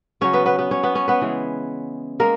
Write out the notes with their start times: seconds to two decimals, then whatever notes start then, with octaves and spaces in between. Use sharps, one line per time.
0.21 C#3 F#3 C#4 C#5
0.33 B3 B4
0.45 B3 B4
0.58 B3 B4
0.71 C#4 C#5
0.83 B3 B4
0.95 C#4 C#5
1.08 B3 B4
1.21 C#3 E3 G#3
2.20 G#3 A#3 A#4